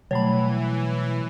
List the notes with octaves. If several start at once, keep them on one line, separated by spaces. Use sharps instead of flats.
B2 E3 F#3 G3 A3 C#5 B5